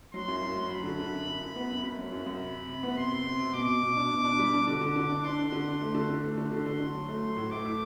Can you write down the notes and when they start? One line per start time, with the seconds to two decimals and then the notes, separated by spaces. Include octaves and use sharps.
0.13 F#3 C6
0.28 F#2
0.42 F#2
0.56 F#3
0.69 F#3 B5
0.84 D3
0.99 D3
1.13 F#2
1.27 F#2
1.41 F#2
1.56 B3
1.70 F#2
1.83 F#2 B5
1.98 F#3
2.12 F#2
2.26 F#2
2.40 C3
2.55 C3
2.68 C3
2.83 B3
2.96 C3 C6
3.12 C3
3.26 C3
3.39 C3
3.54 B2 D6
3.68 B2
3.82 B2
3.96 D4
4.11 B2
4.24 D4
4.39 G3
4.54 D4
4.68 D3 D6
4.81 D3
4.96 D3
5.09 D4
5.24 D4 C6
5.38 D4
5.52 D3
5.67 D4
5.81 A3
5.94 D3
6.09 D3
6.23 A3
6.37 D3 C6
6.51 D3
6.66 D3
6.80 D3
6.94 F#3
7.09 A3
7.23 F#3
7.36 A2
7.51 A3 D6
7.65 E4